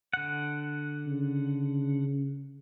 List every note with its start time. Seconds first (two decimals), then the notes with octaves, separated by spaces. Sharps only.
0.13 D3 F#5
1.07 C#3